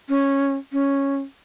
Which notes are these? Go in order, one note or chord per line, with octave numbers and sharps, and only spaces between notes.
C#4
C#4